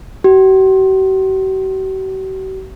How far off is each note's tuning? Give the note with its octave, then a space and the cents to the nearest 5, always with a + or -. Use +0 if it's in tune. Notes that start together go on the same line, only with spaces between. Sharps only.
F#4 +45